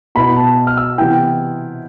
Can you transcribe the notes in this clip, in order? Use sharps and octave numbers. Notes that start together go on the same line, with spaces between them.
B2 B3 E4 B5
A5
F6
E6
C3 E3 B3 E4 G5